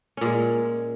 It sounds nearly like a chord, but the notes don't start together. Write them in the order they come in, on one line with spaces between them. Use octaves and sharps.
C#4 A#2 G#3